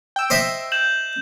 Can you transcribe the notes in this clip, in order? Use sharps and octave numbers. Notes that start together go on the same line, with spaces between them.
G5 E6
C5 D#5 E5
G6 E7 F#7